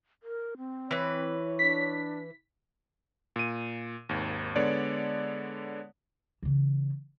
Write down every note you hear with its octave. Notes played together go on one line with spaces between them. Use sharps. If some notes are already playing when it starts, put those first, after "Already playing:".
A#4
C4
E3 B4 C#5
D4 B6
A#2 D#7
G#1 D#2
D3 G#3 B3 C#5 D5
C#3 E3